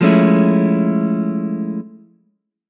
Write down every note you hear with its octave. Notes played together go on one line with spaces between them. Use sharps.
F3 G#3 A3 C#4 E4